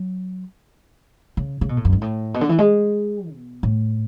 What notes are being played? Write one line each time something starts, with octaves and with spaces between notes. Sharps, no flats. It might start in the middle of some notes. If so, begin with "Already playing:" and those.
Already playing: F#3
C#3
C#3
B2
A2
F#2
G#2
A2
B2
D3
E3
G#3
B2
A2